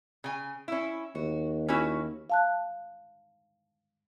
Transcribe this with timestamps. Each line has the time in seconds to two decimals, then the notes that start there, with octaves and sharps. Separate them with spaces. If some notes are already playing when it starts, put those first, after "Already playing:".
0.24 C#3 G#5
0.68 C#4 E4
1.15 D#2 F#4
1.68 C#4 E4 F#4
2.30 F5 A5 F#6